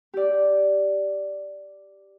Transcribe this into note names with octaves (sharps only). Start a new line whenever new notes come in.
G4 D5